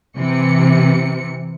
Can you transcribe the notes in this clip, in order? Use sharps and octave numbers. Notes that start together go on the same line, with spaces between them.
C3 E3 C#7